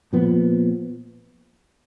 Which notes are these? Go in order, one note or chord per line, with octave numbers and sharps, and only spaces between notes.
A#2 F3 B3